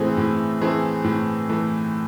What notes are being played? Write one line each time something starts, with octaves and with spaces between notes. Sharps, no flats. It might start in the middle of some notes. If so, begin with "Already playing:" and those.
Already playing: A2 E3 A3 C4 G#4
A2
E3 A3 C4 G#4
A2
E3 A3